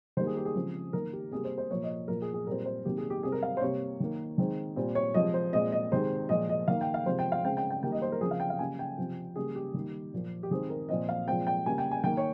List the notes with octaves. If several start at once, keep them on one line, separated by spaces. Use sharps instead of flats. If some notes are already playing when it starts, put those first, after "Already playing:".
D#3 G3 A#3 C5
G#4
G4
G#4
C#3 F3 G#3 C4
D#3 A#3 A#4
G4
C3 G3 A#3 G#4
C5
C5
A#2 F3 A#3 C#5
D#5
A#2 F3 A#3 A#4
G#4
G#4
A#2 G3 C4 A#4
C5
C3 D#3 A#3 G4
G#4
G4
C3 G3 C4 G#4
A#4
F5
C5
C3 G3 A#3 C#5
D#3 A#3
D#3 G#3 C4
A#2 G3 C4
C#5
C3 F3 G#3 D#5
C5
A#2 G#3 C4 D#5
D#5
C3 D#3 G#3 C4 C5
A#2 F3 G#3 D#5
D#5
D#3 A#3 F5
G5
F5
C3 F3 G#3 C5
G5
F5
C#3 G#3 C4 G5
G5
G5
D#3 G3 A#3 G5
D#5
C5
A#4
C#3 F3 C4 G#4
F5
G5
F5
C#3 G3 A#3 G#5
G5
C3 F3 C4
C#3 G3 A#3 G#4
G4
D#3 G3 A#3
A#2 F3 A#3
G4
D#3 G#3 C4 G#4
A#4
A#2 F3 C4 D#5
F5
A#2 F3 G#3 C4 G5
G5
C#3 G3 A#3 G#5
G5
G#5
D#3 A#3 G5
C#5